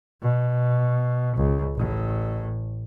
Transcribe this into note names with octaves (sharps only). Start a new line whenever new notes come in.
B2
C#2
A1 A2